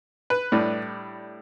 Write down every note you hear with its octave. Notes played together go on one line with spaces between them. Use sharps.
B4
A2 G3 D4